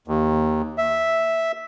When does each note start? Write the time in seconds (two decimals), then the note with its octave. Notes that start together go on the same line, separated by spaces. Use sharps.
0.08 D#2
0.78 E5